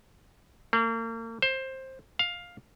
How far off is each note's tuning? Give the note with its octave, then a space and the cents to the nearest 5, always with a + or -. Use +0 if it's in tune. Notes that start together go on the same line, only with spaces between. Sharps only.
A#3 -40
C5 +15
F5 +10